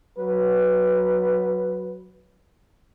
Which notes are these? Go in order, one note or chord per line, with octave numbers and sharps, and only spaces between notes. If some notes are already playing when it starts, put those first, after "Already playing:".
F#3 B4